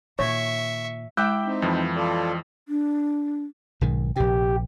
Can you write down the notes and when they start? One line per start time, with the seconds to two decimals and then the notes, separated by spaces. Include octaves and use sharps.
0.19 A#2 D#3 C#5 E5 C#6
1.17 G#3 E4 E5 G5 D6 E6 G6
1.46 C4 D#4
1.62 F2 E3 F3
1.96 F4 A4 D5
2.69 D4
3.81 B1 G#2 D#3
4.16 A#1 C3 G4